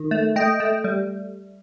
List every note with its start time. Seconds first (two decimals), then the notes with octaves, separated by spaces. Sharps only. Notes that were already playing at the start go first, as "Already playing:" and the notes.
Already playing: D#3
0.11 A3
0.36 A3 D#5 G5
0.60 A3
0.84 G3